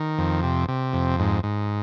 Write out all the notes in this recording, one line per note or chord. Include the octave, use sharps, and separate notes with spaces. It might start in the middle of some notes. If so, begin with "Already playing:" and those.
Already playing: D#3
F2
C3
C3
F2
G#2
G#2